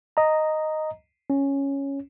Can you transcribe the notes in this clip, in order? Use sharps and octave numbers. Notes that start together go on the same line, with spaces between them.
D#5 A#5
C#4